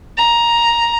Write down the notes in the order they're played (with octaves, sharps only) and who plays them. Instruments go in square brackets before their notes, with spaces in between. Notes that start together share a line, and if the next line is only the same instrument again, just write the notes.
[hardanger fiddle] A#5